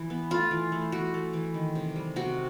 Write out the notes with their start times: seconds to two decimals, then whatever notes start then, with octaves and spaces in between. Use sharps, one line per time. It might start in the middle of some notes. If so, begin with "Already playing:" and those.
Already playing: E3
0.10 B3
0.31 A3 F4
0.51 E3
0.72 A3
0.92 E3 F#4
1.14 A3
1.33 E3
1.54 D#3
1.75 C3
1.96 G3
2.16 C3 F#4